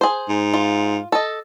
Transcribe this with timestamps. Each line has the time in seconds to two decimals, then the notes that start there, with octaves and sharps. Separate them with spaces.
0.01 G#4 C5
0.29 G#2
0.54 F4
1.12 A4 D#5